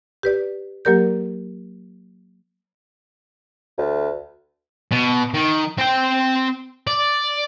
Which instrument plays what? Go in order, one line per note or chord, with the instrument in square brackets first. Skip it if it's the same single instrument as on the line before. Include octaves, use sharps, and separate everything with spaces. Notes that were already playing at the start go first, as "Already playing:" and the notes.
[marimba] G4 B4 D5
F#3 A#3 G4 A#4 D5 G6
[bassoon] D2
[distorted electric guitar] B2
D#3
C4 G5
D5